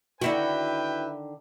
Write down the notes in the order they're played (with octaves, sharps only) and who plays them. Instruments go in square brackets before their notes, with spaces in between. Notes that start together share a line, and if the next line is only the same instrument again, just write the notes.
[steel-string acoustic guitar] D3 D#3 [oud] E4 F#4 [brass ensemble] B4 E5 G5